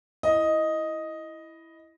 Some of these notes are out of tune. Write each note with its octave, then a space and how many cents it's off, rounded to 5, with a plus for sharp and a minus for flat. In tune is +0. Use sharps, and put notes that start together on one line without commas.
E4 +0 D#5 +5